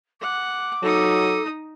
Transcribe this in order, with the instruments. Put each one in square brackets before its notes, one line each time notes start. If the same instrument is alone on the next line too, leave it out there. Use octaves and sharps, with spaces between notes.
[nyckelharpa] F#5 [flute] D6
[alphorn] F#3 [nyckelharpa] D#4 D#6 [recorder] A4